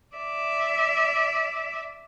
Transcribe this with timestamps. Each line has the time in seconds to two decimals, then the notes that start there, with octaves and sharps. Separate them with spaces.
0.16 D5 E5